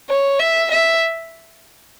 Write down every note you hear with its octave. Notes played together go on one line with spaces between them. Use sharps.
C#5
E5
E5